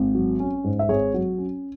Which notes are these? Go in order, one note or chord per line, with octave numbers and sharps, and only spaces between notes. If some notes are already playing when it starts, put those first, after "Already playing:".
Already playing: G#1
F#3
C#4
G#2
E5
G#1 G#4 C#5
F#3
C#4